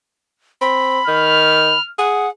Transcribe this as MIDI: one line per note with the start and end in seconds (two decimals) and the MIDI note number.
0.61 1.00 60
0.61 1.80 83
1.07 1.73 51
1.07 1.87 89
1.98 2.27 68
1.98 2.30 78